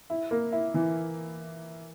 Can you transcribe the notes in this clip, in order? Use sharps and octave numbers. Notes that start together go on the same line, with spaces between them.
E4
A#3
E4
E3